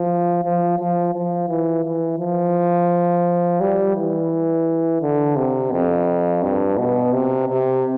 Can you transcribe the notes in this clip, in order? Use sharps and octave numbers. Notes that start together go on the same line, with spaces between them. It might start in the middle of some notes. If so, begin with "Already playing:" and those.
Already playing: F3
F3
F3
F3
E3
E3
F3
G3
E3
D3
C3
F2
G2
B2
C3
C3